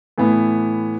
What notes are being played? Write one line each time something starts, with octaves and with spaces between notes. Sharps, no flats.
A2 E3 B3